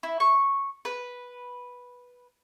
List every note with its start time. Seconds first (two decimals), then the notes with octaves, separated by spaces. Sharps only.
0.03 E4
0.20 C#6
0.85 B4